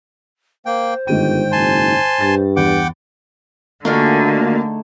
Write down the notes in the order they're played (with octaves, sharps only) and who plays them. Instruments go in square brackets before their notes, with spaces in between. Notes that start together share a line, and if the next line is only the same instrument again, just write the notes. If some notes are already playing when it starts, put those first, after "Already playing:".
[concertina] A#3 G5 [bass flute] C5
[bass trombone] G1 [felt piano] G#2 D#3 D#7 [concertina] G5
[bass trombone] F#1 [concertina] G#5 A5 C6
[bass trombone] G2 [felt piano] A6
[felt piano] E2 [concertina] F#5 G5 D6
[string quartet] D3 [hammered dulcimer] A3 D#4 G#4 [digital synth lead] A#3 [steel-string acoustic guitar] D4 F4 F#4